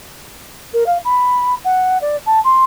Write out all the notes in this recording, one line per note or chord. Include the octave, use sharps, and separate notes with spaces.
A#4
F5
B5
F#5
D5
A5
C6